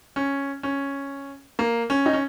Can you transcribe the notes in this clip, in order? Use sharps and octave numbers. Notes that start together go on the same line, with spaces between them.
C#4
C#4
A#3
C#4
D#4
C#4